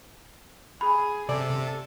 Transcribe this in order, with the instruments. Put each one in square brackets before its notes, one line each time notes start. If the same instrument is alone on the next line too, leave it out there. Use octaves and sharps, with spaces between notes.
[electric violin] G#4 [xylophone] B5
[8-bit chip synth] C3 [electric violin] A4 [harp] D5